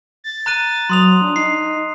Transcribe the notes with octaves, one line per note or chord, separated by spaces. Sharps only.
A6
A#5 F#6 D#7
F#3 C6 D#6 F7
D4
D#4 C7